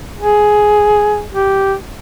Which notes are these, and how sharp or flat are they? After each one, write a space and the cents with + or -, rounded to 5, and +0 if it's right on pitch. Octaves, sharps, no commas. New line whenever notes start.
G#4 +10
G4 -10